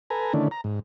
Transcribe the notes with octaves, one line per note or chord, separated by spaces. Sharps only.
A4 B4 G#5 A#5
D3 D#3 A3 C#4 D4 E4
A#5
G#2